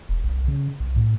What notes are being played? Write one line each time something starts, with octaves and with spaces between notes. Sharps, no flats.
E1
C2
C#3
C2
A2